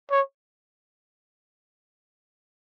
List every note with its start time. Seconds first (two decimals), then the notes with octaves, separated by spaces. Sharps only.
0.11 C#5